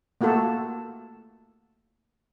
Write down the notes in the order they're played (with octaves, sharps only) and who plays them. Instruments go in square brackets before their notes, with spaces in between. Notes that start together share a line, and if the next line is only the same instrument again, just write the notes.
[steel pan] A3 A#3 F4 F#4 A4